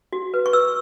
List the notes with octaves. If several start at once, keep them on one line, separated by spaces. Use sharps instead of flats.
F#4
B4
C#6
B4 E6